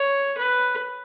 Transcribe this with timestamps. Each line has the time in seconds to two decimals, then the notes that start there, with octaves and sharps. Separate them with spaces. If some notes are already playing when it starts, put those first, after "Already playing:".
Already playing: C#5
0.38 B4